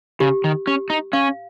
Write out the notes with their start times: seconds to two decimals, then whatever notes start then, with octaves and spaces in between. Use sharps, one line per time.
0.20 C#3 G4
0.44 D#3
0.67 C#4 G4
0.90 D#4
1.13 C#4 F5